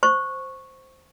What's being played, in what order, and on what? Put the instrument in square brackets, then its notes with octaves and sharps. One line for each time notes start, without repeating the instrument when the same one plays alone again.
[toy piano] C5 C#6